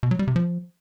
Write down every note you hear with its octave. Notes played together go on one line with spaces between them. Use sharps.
B2
F#3
G3
C3
F3